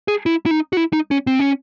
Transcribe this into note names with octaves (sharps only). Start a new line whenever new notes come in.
G#4
E4
E4
D#4
F#4
E4
D#4
C#4
C4
C#4